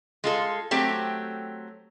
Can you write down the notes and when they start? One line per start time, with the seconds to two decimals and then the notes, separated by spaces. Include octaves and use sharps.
0.24 G#3 F4 A4
0.71 F#3 A3 C4 G4